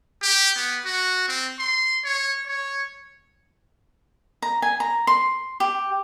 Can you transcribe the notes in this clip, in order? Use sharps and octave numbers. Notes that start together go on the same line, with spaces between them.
G4
B3
F#4
C4
C6
C#5
C#5
A#5
G#5
A#5
C6
G4